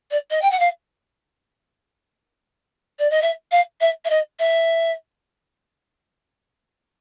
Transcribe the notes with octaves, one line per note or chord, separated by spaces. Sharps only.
D5
D#5
G5
F#5
F5
D5
D#5
E5
F5
E5
E5
D#5
E5